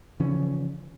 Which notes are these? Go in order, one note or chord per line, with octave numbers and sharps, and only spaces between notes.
C#3 E3 F3 C#4